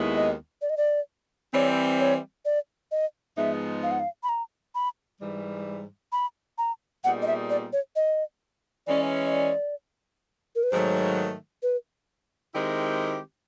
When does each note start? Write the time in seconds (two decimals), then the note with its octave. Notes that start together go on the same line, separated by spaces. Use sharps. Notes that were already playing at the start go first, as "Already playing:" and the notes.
Already playing: D#2 D#3 G#3 B3 E4
0.16 D#5
0.62 D5
0.70 D#5
0.77 D5
1.53 E3 G3 C4 C#5
2.00 C#5
2.45 D5
2.92 D#5
3.37 G#2 F3 G#3 B3 D#4 E5
3.83 F5
3.91 F#5
4.00 F5
4.23 B5
4.29 A#5
4.75 B5
5.20 G#2 E3 G3
6.12 B5
6.58 A#5
7.04 A#2 G3 B3 D#4 G#4 F#5
7.22 D#5
7.27 E5
7.50 D5
7.73 C#5
7.96 D#5
8.87 E3 G#3 C#4 D5
9.26 D#5
9.33 D5
10.55 A#4
10.63 B4
10.71 G#2 D#3 F#3 A3 C5
11.63 B4
12.54 D#3 G#3 C4 E4 G4